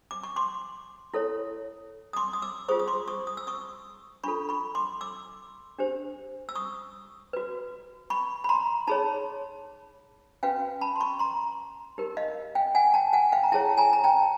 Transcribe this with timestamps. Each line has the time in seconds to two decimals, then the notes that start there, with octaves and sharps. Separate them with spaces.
0.11 D6
0.23 C#6
0.36 C6 D6
1.14 E4 A4 C#5
2.13 D#6
2.17 C6 D6
2.33 D#6
2.42 D6 E6
2.68 F4 G#4 C5 C#6 D#6
2.79 D#6
2.88 C6 D6
3.08 C#6 D#6
3.27 D#6
3.37 E6
3.47 C#6 D#6
4.24 D4 F4 A4 B5 C#6
4.49 B5 C#6
4.75 C6 D6
5.01 D6 E6
5.79 D4 G4 C5
6.49 E6
6.56 C#6 D#6
7.33 F#4 B4
8.10 B5 C#6
8.44 B5
8.49 A#5 C6
8.87 D#4 G#4 C#5 A5 B5
10.43 C#4 F#4 B4 F5 G5
10.81 A5 B5
10.96 C6
11.00 B5 C#6
11.19 A#5 C6
11.98 D#4 G4 A#4
12.17 D#5 F5
12.55 F5 G5
12.75 F#5 G#5
12.94 G5 A5
13.13 F#5 G#5
13.32 F5 G5
13.43 A#5
13.52 E4 G#4 C#5 G5 A5
13.77 G#5 A#5
13.93 A#5
14.04 G5 A5